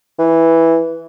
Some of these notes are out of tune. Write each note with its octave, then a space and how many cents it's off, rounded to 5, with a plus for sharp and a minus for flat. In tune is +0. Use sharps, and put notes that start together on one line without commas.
E3 -5